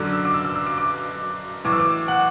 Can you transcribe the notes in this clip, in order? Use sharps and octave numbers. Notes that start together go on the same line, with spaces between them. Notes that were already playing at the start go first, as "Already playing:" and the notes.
Already playing: F#2 D3 F#3 D6
E6
D6
E6
E6
E6
D6
D6
A2 E3 D6
E6
D6
F#5